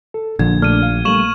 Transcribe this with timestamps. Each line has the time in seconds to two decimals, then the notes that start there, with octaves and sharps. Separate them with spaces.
0.14 A4
0.39 A#1 D3 F3 G#6
0.62 A#2 A3 D4 F6 D#7
0.83 F5
1.05 G3 A3 A#3 C#6 E7 F#7